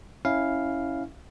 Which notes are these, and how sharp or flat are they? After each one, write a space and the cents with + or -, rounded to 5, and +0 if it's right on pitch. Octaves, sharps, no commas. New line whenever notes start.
C#4 +0 E4 -15 F5 +0